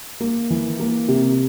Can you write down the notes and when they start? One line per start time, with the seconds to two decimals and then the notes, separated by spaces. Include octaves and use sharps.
0.20 A#3
0.50 E3
0.80 A#3
1.08 C3